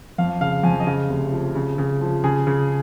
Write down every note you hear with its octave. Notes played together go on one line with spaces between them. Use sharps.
F2 F5
C#3 F5
F2 G#5
D#5
C#3 F5
F1
F3
C#3
C#3
F3
C#3 G#4
C#3